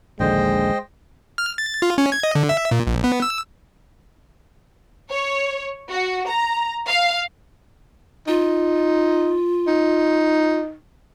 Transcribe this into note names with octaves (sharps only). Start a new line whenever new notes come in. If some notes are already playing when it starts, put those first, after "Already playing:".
A#1 D#2 D3 G#3 C5 D#5 G5
F6
A6
F4
C#4
G#6
D#5
D3
E5
A#2
A#1
B3
E6
C#5
F#4
A#5
F5
D#4 F4
D#4